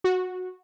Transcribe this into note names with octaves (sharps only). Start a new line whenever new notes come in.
F#4